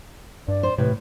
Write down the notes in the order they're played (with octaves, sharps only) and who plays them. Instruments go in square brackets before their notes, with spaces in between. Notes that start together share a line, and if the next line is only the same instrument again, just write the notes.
[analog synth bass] G2 [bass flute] D5
[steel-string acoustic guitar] C5
[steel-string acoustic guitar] E2 A2 [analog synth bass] C3 [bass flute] B4